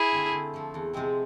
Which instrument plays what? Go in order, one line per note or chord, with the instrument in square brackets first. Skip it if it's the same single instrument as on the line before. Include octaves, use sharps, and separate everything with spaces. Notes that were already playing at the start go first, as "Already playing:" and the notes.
Already playing: [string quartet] E4 G#4
[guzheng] D3 A3 C4 F4
D3
F3 A3
E2
C3 F3 G#3 C4